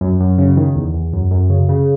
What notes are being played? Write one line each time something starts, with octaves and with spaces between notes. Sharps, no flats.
F#2
F#2
C#3
D#3
E2
E2
F#2
F#2
C#3
C#3